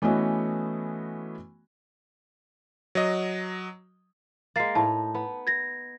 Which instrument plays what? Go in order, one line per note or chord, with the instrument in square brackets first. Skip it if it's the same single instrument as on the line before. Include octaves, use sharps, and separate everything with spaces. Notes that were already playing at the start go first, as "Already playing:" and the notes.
[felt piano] E3 A3 B3 C#4 F#4 D#5
[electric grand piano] F#3 D#5
[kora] G#3 A#3 [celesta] A6 C7
[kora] A2 D#4 [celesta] A5
[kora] B3
[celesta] G#6 A#6